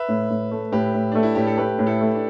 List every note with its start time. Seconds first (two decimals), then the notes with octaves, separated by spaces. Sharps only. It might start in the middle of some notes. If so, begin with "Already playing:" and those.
Already playing: B4 E5
0.09 A2
0.30 A2
0.51 A3
0.72 A2 G4 B4
0.94 A2
1.12 A3 D4
1.23 E4
1.35 A2 G4
1.47 A4
1.57 A3 G4 B4
1.79 A2
1.86 E4 A4
2.01 A3
2.15 D4